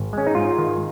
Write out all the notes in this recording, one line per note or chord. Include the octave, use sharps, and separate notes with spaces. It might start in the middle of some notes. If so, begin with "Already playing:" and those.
Already playing: G#1
G#3 C#4
D#4
G#2 F4
D#3